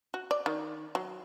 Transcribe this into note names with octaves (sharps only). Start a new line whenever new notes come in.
F#4
D5
D#3
F#3